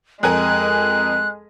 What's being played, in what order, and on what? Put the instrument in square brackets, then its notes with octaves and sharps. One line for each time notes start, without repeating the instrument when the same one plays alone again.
[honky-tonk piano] F2 A#4 G#5 [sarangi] G#3 [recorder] F#6